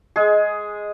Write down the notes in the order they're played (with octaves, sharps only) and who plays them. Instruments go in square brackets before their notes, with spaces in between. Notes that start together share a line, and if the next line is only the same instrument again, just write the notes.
[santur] G#3 G#4